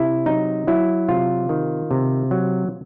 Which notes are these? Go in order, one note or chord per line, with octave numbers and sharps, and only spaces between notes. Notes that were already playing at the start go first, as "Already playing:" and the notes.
Already playing: C3 E4
F#3 D#4
F#3 E4
C3 F4
D#3
C3
F#3